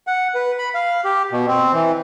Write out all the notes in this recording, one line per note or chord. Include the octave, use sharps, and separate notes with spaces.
F#5
B4
B5
F5
G4
B2
C4
E3